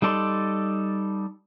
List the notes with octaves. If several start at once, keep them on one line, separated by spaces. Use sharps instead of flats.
G3 D#4 A4 D5 C6